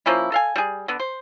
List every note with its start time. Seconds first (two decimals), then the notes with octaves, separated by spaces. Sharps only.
0.06 F3 A#3 C#4 E4
0.32 A4 F5 G#5
0.56 G3 G#4
0.88 D3 B3
0.99 C5